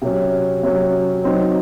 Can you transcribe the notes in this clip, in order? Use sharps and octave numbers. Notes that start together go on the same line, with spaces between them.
C3 F#3 C#4
C3 F#3 C#4
F#3 C4 D#4